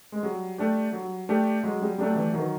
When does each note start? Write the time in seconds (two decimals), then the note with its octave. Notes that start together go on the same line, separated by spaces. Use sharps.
0.12 G#3
0.23 F#3 G3
0.58 A3 D4 G4
0.93 F#3
1.29 A3 D4 G4
1.63 F#3 G#3
1.82 G3
1.98 F#3 A3 D4 G4
2.16 E3
2.33 D#3 F#3